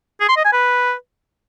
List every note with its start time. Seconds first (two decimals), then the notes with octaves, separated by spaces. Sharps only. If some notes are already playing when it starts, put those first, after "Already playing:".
0.20 G#4
0.29 C6
0.37 D#5
0.45 G#5
0.53 B4